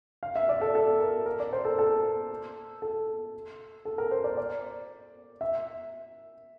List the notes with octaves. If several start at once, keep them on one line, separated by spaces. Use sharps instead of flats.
F5
E5
D5
A4
A4
A#4
A#4
D5
C5
A4
A4
A4
A4
A#4
C5
D5
D5
E5